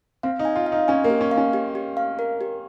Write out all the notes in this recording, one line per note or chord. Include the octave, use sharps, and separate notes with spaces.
C4 F5
D#4
G#5
F4
F5
D#4
C#4 G#5
A#3
G4
C#4
F5
C#4
G4
G4
F5
A#4
G4